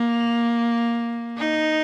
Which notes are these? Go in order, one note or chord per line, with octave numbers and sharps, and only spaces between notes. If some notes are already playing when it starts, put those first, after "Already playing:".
Already playing: A#3
D#4